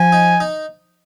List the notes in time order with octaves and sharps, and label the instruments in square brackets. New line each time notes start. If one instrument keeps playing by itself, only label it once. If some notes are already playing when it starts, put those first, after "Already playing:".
Already playing: [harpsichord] F3 [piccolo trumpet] G#5
[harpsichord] D#4
D#4